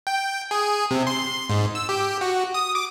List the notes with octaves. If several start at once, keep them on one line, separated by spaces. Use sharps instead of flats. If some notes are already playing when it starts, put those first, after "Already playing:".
G5
G#4
C3
C6
G#2
E6
G4
F#4
D#6
D6